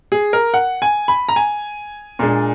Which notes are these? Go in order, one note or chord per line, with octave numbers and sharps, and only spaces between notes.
G#4
A#4
F#5
G#5
B5
A#5
G#5
A#2 G#3 D4